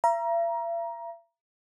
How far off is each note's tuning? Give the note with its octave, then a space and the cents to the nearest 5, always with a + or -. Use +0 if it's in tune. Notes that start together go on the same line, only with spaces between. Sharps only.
E5 +45 A#5 +20